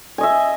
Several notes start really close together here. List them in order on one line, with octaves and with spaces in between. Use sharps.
G#5 D#5 E5